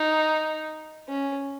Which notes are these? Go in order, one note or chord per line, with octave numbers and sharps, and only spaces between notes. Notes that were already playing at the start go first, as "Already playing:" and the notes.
Already playing: D#4
C#4